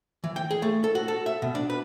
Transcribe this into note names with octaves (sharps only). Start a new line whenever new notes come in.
E3
G5
G#4
A3
A4
F#4
A4
E5
B2
D4
B4